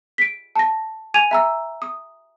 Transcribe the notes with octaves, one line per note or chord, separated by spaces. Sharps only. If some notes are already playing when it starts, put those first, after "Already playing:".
B6 D7
A5 A#6
G#5 G#6 D#7 F7
E5 A#5 E6
D#6